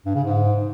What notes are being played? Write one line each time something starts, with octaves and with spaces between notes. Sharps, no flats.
G2
C#3
G#2